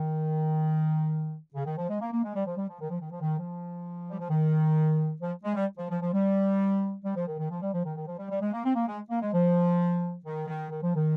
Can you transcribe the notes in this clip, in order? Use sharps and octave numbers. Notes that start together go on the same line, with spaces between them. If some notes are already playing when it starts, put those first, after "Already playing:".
Already playing: D#3
C#3
D#3
F3
G#3
A#3
A#3
G#3
G3
F3
G3
F3
D#3
F3
D#3
F3
D#3
F3
G3
F3
D#3
F3
G#3
G3
F3
F3
F3
G3
G3
F3
D#3
D#3
F3
G3
F3
D#3
D#3
F3
G3
G3
G#3
A#3
C4
A#3
G#3
A#3
G#3
F3
D#3
D#3
D#3
F3
D#3